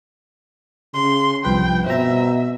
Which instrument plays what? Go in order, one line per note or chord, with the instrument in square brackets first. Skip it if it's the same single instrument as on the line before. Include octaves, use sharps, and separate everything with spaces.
[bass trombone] C#3 [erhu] C6
[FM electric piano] C2 G2 B4 [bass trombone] F3 [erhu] G5
[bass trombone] B2 [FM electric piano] C4 A#5 [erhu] E5